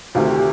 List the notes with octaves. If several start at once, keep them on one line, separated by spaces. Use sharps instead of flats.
D2 C3 D#3 F4
G4
G4